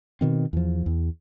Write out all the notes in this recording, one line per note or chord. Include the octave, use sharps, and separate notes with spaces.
B2 D#3 C4
E2 F3
E2